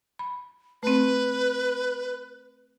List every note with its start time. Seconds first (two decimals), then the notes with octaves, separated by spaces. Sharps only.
0.19 B5
0.83 A3 C4 B4